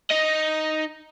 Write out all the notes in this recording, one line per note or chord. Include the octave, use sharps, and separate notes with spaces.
D#4 D#5